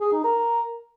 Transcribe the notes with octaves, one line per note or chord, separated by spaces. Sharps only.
G#4
D#4
A#4